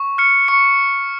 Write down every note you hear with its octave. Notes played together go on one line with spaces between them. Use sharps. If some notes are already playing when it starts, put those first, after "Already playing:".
Already playing: C#6
F6 C#7
C#6 C#7